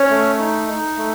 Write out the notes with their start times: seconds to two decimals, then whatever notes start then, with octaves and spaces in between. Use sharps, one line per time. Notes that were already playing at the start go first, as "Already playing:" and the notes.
Already playing: C#4 C#5
0.10 A3
0.39 D#4
0.68 D#4
0.97 A3